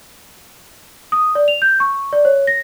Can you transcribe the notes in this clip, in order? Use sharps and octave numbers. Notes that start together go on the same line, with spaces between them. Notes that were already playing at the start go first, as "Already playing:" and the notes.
D#6
D5
F7
G6
C#6
D5
C#5
A#6